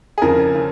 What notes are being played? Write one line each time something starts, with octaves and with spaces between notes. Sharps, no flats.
G#4
F2 C#3 F3 A#4
C#3